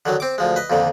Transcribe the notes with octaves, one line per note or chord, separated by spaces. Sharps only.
D3 D#3 F#3
C4 D6
D2 F3 G#3
B4 D#5
F2 A#2 D3 D#3